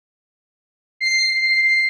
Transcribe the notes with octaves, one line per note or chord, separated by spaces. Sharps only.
C7